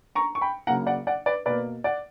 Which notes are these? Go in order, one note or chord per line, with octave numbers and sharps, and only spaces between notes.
A#5 C#6
C#6
G5 B5
C#3 F#3 A#3 F#5 A#5
D5 F#5
D5 F#5
B4 D5
B2 A#3 B4 D5
D5 F#5